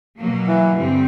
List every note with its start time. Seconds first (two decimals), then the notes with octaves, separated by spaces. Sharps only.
0.18 B2 F#3 A#3
0.47 E3
0.75 G2 D3 G3 C4